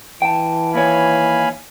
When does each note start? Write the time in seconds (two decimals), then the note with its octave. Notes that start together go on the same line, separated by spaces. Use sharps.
0.22 E3 G5 A5
0.74 D#2 C#5 F5 G#5 B5